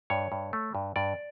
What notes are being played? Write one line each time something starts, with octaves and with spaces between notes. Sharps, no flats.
G2 C#5
G2
A3
G2
G2 D5